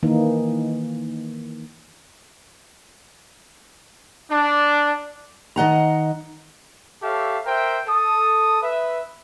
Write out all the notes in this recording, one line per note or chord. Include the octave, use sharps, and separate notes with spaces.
D#3 E3 A#3 D#4
D4
D#3 D#5 F#5 A#5
G4 A4 C#5 E5 F5
A#4 C5 E5 G5
A4 D#6
B4 E5